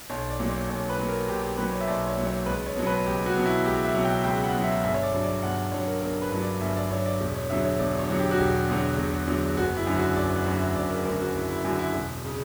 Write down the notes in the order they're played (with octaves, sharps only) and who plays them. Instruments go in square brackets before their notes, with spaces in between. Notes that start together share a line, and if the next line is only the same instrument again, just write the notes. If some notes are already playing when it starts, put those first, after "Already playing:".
[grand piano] B1 C#5
D5
A#2 F#3
C#5
B1 C#5
B4
A#2 F#3
A#4
B1 G4
G4
A#2 F#3 B4
C#5
E5
B1 D5
C#5
A#2 F#3
C#5
C#2 B4
C#5
B2 F#3
B4
C#2 G4
F#4
B2 F#3
E4
C#2 G4
E5
B2 F#3
G5
C#2 G5
F#5
B2 F#3
E5
G1 E5
C#5
D5
G2 F#3
D5
G1 F#5
G2 F#3 C#5
A#4
G1 A#4
B4
G2 F#3
D5
G1 E5
D5
G2 F#3 C#5
D5
E1
C#5
E2 D3 F#3 E5
C#5
E1 D5
C#5
E2 D3 F#3
G4
F#4
E1 G4
E2 D3 F#3
E1
E2 D3 F#3
F#1 F#4
E4
F#2 D3 F#3
F#4
F#1 D5
F#5
F#2 D3 F#3
E5
F#1 D5
A#4
F#2 D3 F#3 A#4
F#4
F#1 E4
E4
F#2 D3 F#3 F#4
E4
E1
C#3